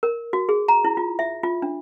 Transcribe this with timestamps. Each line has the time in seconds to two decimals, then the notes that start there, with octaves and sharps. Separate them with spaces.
0.03 A#4
0.33 F#4
0.49 G#4
0.68 A#5
0.85 E4
0.97 F4
1.19 E5
1.43 F4
1.62 D4